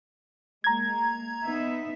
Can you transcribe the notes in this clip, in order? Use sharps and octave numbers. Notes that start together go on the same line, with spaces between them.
G#3 A#3 A#5 G#6
B3 D#4 E5